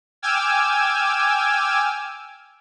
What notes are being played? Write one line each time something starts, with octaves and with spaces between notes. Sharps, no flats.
G5 G#5 D6 E6 F6 G#6